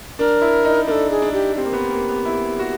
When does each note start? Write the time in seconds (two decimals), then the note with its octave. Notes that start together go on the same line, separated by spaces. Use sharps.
0.19 D4 A#4
0.41 E4
0.65 D#4
0.87 D4 A4 A#4
1.10 G#4
1.22 D4
1.33 G4
1.56 C4 G4
1.64 A#3
1.73 B3
1.90 A#3
2.09 B3
2.25 E4
2.59 F#4